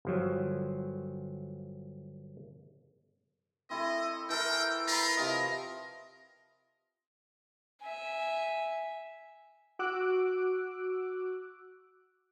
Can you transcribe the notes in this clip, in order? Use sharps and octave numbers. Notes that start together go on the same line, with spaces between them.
G1 F3 F#3
C4 E4 A4 D#5
E3 A4 A#4 G5
F4 A#5 B5
C3 F3 A#4 D#5
E5 G#5
F#4 D6 E6 F#6 D7